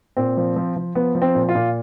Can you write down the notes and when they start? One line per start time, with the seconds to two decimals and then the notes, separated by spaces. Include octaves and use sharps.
0.17 A#2 C4
0.37 F3
0.56 F3
0.76 F3
0.95 F3 B3
1.15 F3
1.22 C4
1.35 A#2
1.49 F4
1.55 A#2